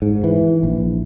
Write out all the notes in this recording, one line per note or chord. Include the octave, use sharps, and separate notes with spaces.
G#2
E3
A#1